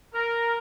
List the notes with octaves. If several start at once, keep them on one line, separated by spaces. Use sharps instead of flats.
A#4